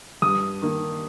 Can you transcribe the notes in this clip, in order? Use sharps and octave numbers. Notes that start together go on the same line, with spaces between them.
G2 D#6
D#3 A#3